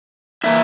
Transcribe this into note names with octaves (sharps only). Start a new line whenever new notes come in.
E3 A#3 E4 E5